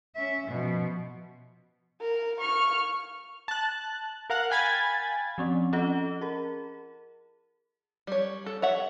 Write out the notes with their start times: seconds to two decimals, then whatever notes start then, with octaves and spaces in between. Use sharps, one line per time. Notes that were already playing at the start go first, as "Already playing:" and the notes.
0.15 C#4 E5
0.47 B2 F3
2.01 A#4
2.41 C#6 F6
3.48 A5 F#6
4.30 A#4 F5 F#5 F#6
4.50 F5 G5 G#5 B5 G#6 A6
5.38 F3 C4 C#4
5.73 C#4 F4 A4 D#5 F#5
6.21 G#4 A#4
8.07 G3 C#5
8.46 A4
8.62 C#5 E5 F#5